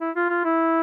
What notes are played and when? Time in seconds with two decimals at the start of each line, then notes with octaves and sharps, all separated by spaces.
0.01 E4
0.15 F4
0.29 F4
0.45 E4